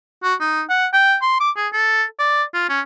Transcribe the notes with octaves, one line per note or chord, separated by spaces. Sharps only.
F#4
D#4
F#5
G5
C6
D6
G#4
A4
D5
F4
C#4